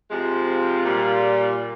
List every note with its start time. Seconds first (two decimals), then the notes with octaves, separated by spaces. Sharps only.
0.11 C3 F3 G#3
0.47 F4
0.84 A#2 G3